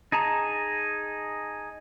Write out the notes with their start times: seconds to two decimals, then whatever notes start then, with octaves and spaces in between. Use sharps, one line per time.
0.12 D#4 G#4 A5 A#5